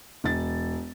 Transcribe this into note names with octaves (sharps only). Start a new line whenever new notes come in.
E1 A6